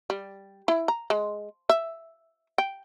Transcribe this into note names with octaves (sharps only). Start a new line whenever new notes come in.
G3
E4
A#5
G#3
E5
G5